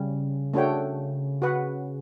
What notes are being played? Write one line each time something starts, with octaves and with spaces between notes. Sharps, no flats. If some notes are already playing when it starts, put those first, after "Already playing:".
Already playing: C#3 G3 C#4
A3 D4 F#4 C#5 G5
F#4 B4 F#5